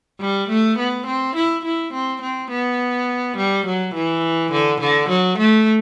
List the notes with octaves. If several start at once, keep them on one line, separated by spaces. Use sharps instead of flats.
G3
A3
B3
C4
E4
E4
C4
C4
B3
G3
F#3
E3
D3
D3
F#3
A3